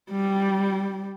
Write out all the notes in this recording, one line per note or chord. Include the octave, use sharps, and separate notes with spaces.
G3